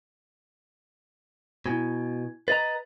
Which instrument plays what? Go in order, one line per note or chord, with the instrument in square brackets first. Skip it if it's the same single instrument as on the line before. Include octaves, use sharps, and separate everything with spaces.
[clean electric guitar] B2 [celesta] E4 G#5 G#6
[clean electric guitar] B4 D#5 A#5 [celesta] A6